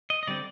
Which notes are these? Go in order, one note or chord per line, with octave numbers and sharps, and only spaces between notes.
D#5
D#5
D3 G3 C4 D5